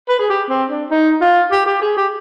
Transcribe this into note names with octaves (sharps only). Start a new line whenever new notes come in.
B4
G#4
G4
C4
D4
D#4
F4
G4
G4
G#4
G4